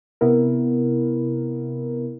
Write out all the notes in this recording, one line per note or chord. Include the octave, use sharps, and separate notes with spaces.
C3 B3 E4 A#4